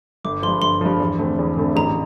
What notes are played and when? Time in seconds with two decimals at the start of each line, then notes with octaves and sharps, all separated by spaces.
0.24 G1 D6
0.43 G2 F3 C6
0.62 G1 C6
0.81 G2 F3
1.00 E2
1.19 D3 A3 C4
1.39 E2
1.57 D3 A3 C4
1.76 A1 A#5